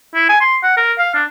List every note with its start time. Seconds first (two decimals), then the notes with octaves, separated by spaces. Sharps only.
0.14 E4
0.29 G#5
0.41 C6
0.63 F#5
0.77 A#4
0.98 F5
1.14 D4